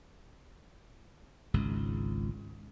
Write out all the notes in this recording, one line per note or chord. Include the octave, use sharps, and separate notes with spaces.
G#1 C#2 G#2